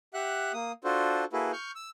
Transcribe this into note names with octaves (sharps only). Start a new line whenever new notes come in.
G4 E5 F#5 F#6
A#3 D#6
D4 F4 F#4 A4 C5
A#3 E4 F#4 G#4 A4 B4
C#6 F6 G6
E6